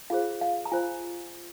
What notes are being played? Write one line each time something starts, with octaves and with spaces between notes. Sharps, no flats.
F4 G#4 C5 F5
F5
A#5
F4 C5 G#5